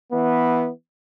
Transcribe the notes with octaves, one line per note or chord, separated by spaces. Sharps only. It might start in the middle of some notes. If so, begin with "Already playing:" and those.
E3 B3